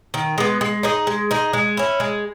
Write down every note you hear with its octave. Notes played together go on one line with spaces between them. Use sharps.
D#3
G#3 B3
G#3
D#4 G#4 D#5
G#3
D#4 G#4 D#5
G#3
C#4 E4
G#3